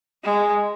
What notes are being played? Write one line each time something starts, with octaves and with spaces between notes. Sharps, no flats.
G#3